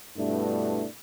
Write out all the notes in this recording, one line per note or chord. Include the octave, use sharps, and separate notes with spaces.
G2 B2 A3 B3 D4 E4